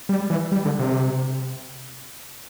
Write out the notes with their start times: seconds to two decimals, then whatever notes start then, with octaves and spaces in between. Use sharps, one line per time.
0.09 G3
0.30 E3
0.52 G3
0.65 D3
0.79 C3